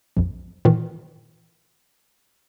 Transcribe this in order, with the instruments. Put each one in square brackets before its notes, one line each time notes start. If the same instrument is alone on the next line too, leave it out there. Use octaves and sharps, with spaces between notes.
[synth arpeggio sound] A#1 F2
A#2 D#3 E3